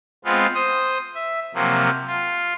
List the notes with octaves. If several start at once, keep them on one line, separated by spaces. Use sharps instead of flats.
G#3 B3 C4 F4
C5 D#6
E5
C3 F3 F#3 A#3
F4